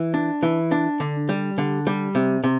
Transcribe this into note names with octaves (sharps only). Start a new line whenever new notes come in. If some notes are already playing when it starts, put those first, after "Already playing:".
Already playing: E3
D4
E3
D4
D3
G3
D3
G3
C3
C3